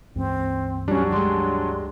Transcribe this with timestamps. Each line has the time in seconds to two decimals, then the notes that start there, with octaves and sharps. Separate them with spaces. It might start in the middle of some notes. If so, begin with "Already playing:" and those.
0.16 C#2 G2 E3 C4
0.88 F#3 G3 C#4 D4
1.12 G3 G#3 C6